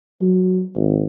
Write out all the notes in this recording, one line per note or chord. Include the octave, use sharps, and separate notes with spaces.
F#3
G#1